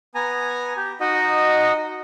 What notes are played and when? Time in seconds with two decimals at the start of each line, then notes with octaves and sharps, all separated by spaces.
0.15 B3 G#5 A#5
0.77 G4
1.00 D#4 F#4 D#5